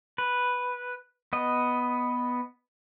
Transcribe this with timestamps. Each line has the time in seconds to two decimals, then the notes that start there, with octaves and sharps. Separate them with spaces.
0.18 B4
1.33 B3 D#5